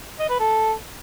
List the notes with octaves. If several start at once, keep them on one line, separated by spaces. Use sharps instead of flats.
D#5
B4
A4